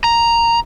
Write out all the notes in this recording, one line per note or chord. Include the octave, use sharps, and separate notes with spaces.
A#5